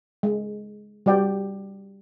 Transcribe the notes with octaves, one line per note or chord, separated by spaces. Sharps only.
G#3
G3 F#4 D5 G5